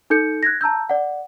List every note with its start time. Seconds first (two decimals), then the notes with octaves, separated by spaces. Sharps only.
0.10 D#4 A4 G6 C#7
0.43 F#6 G#6 A#6
0.61 A5 A#5 E6 G6
0.89 D5 F#5